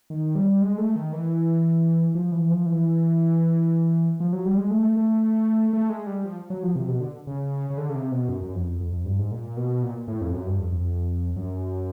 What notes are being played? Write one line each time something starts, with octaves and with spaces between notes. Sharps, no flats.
D#3
G3
G#3
A3
D#3
E3
F3
E3
F3
E3
F3
F#3
G3
G#3
A3
A3
A3
G#3
G3
F3
F#3
F3
C3
B2
D3
C#3
C#3
D3
C#3
C3
B2
F#2
F#2
F2
F2
F2
G2
G#2
A#2
B2
A#2
A2
F2
F#2
G2
F2
F2
F#2